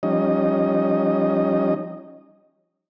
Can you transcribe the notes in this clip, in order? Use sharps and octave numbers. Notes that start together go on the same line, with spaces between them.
F3 G3 C#4 D#4 D#5